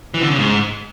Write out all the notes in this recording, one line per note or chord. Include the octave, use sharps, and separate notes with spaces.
E3
D3
C#3
G#2